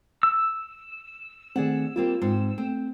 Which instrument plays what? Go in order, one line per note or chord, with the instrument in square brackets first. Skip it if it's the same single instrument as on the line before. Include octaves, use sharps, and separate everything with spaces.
[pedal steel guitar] E6
[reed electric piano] D#3 A3 C4 [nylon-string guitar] G#4 D5 F#5
[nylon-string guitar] G3 A#3 C4 [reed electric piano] F4
[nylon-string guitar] G#2 C4
[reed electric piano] A3 [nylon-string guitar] C4